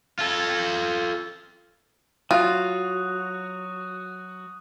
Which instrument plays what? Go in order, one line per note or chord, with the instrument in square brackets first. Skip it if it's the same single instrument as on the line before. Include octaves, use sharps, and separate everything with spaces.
[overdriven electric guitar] F4 A4
[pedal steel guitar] F#3 F#4 [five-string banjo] F4 [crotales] D#6 F#6 D#7